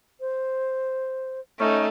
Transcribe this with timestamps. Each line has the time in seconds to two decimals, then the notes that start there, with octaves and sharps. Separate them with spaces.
0.20 C5
1.59 A3 C#4 D#4